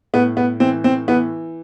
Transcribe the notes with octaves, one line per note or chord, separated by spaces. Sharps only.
A2 B3
B3
E3 C4
C4
E3 B3